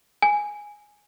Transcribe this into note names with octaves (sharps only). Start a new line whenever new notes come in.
G#5